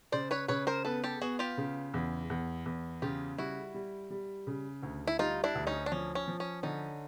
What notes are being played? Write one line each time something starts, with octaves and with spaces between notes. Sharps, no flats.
C#3 C5 D5
B4 C#5
C#3 B4 C#5
A#4 C5
B3 A4 B4
G4 A4
B3 F#4 G#4
F4 G4
C#3
E2
E2
E2
C#3 F4 G4
G3 E4 F#4
G3
G3
C#3
D2
E4
G3 D#4 F4
D4 E4
D2
C#4 D#4
D4
F3 C#4
C#4
F3
C#4
D3 C#4 D#4